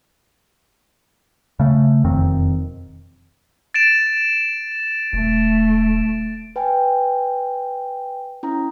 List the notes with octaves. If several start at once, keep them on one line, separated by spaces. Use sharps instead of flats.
C#3 A3
E1 F2 D#3 C4
A6 D7 E7
D#1 A3
B4 G5 G#5
C#4 E4 A#5